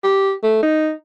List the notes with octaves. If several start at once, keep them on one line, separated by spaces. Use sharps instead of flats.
G4
A3
D#4